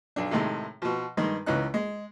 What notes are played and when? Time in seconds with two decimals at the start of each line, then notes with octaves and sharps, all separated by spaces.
0.16 B1 D4
0.31 A2 C3 D#3 G#3
0.82 B2 F3
1.17 G2 D#3 G#3
1.46 C#2 E3 C#4 D#4 F#6
1.74 G#3